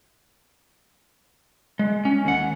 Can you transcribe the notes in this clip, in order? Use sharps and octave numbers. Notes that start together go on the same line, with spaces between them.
G#3
C#4
D#2 F#5